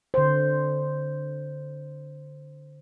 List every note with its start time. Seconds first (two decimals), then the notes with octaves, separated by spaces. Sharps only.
0.14 D3 C5